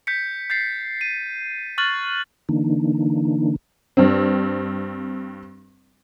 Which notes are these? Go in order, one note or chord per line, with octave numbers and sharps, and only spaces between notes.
G6 B6 C#7
G6 A6 C7
D#7
C#6 F6 F#6 A6 F#7
D3 E3 A#3 D4 D#4
G2 C4